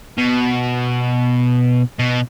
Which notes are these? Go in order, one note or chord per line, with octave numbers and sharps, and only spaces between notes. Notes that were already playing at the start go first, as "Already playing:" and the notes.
B2
B2